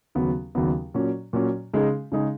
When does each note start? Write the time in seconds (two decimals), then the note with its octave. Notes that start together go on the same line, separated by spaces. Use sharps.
0.15 D#2 C#3 F#3 B3
0.55 D#2 C#3 F#3 B3
0.94 A#2 F#3 C#4
1.33 A#2 F#3 C#4
1.74 C#3 G#3 D#4 G#4
2.12 C#3 G#3 D#4 G#4